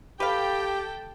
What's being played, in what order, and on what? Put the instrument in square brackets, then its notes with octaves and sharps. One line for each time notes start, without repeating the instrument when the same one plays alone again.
[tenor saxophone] G4 [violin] A4 G5 [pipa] B4 F5